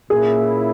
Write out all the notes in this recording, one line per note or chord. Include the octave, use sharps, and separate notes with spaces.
A#2 A#3 C#4 E4 G#4